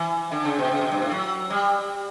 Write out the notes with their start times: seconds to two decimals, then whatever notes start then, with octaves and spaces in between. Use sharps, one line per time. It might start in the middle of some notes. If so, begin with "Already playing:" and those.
Already playing: E3
0.32 D3
0.45 C#3
0.59 B2
0.71 C#3
0.81 B2
0.91 G2
1.02 A2
1.12 F#3
1.50 G3